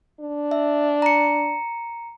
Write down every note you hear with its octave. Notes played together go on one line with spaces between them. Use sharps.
D4
E5
A#5 C#7